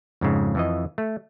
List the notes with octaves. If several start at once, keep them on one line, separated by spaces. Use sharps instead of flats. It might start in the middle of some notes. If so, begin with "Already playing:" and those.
F2 G#2 C#3
F2 E3 D#5
A3